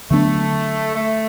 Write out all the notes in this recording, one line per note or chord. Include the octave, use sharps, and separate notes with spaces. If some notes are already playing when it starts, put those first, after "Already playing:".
D3 F#3 A3 B3 D4
A3